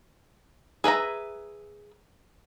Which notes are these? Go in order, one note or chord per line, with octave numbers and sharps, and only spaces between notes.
G#4 B4 E5 A#5